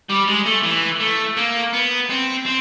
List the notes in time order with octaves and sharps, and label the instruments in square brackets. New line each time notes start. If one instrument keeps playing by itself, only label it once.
[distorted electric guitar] G3
G#3
A3
E3
A3
A#3
B3
C4
C4